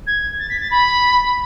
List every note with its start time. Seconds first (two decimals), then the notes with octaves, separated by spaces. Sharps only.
0.07 G#6
0.39 A6
0.49 B6
0.60 A6
0.71 B5